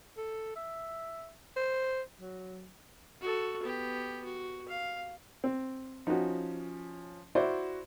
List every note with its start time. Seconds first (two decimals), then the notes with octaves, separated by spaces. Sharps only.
0.17 A4
0.56 E5
1.57 C5
2.21 F#3
3.21 F#4 A4
3.63 B3 G4
4.24 F#4
4.68 F5
5.44 C4
6.07 F3 C#4 D#4 F#4
7.35 E4 F#4 C5 D5